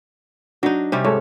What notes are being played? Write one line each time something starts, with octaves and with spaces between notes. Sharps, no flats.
F#3 D4 D#4
C3 G3 C#4
G#2 A4 C#5